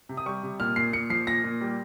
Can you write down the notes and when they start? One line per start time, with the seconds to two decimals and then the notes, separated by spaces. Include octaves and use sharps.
0.09 C3
0.17 D#6
0.26 G3 C#6
0.43 C3
0.60 A#2 F6
0.76 A#2 C7
0.93 A#2 C#7
1.10 F3 C7
1.27 A#2 A#6
1.44 A#2
1.61 G3